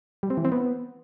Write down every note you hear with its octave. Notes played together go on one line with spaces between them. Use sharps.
G3
C4
E3
C4
B3